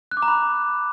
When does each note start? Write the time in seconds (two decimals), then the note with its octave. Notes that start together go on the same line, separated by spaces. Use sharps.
0.11 F#6
0.17 D6
0.22 A#5
0.28 B5